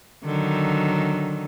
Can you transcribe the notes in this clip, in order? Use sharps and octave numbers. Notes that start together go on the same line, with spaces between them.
D3 D#3 F#3